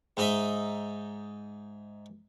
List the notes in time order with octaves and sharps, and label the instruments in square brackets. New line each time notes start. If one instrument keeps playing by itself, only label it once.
[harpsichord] G#2 D#4 D#5 E5